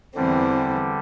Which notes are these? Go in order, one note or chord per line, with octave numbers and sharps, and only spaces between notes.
E2 D3 E3 G3 C4